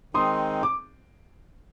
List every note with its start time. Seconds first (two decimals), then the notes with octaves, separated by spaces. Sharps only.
0.14 D#3 G#3 C4 D#4 C6 D#6
0.63 D6